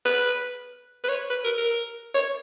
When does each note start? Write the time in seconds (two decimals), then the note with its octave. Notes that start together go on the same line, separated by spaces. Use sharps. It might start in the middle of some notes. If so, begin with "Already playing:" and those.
0.05 B4
1.04 B4
1.09 C#5
1.30 B4
1.44 A#4
1.58 A#4
2.14 C#5